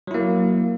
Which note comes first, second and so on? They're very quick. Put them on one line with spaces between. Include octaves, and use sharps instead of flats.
F#3 E4 A#3